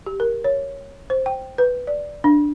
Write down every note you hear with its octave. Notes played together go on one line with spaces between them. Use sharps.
G4
A#4
C#5
C5
G5
B4
D5
D4